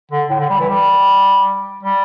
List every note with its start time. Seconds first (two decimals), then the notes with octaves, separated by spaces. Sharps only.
0.11 D3
0.30 A2
0.39 D3
0.50 G3
0.60 E3
0.69 G3
1.83 G3